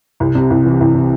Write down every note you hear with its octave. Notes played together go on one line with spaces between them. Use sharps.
C2
C3
C2
E3
C2
C3